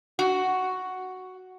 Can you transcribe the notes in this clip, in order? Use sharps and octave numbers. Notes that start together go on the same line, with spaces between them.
F#4